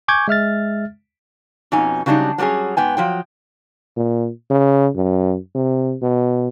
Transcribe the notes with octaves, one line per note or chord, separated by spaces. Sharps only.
G#5 C#6 D6 G6 G#6
G#3 E5 F6 A6
F2 B2 C#4 D#4 G#5
C#3 F#3 G3 D4 D#4
F#3 G3 A#3 C#4 G#4
G#2 B3 G5 G#5
F3 F#3 G5
A#2
C#3
F#2
C3
B2